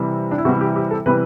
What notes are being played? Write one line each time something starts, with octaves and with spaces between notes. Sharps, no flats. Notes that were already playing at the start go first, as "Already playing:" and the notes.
Already playing: C3 E3 G3
D4
E4
C3 E3 G3 F#4
G4
G4
A4
C3 E3 G3 B4